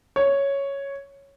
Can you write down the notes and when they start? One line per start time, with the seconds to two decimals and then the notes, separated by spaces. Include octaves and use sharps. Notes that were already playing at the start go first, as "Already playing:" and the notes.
0.16 C#5